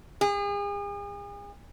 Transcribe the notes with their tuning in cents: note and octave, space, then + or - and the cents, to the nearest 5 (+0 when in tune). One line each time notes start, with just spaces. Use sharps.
G#4 -40